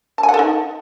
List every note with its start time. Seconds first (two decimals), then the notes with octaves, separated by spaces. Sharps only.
0.18 A5
0.23 G#5
0.29 F#5
0.34 A4
0.39 D#4